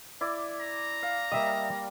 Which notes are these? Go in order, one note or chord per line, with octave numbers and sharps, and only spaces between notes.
E4 D5 D6
A#5
F5
G3 A#3 D#5 E5